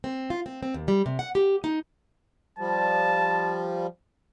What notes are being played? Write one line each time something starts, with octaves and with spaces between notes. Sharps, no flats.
C4
F4
C4
C4
D#2
G3
C3
F#5
G4
D#4
F3 G3 A5